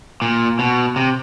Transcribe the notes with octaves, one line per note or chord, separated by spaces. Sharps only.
A#2
B2
C3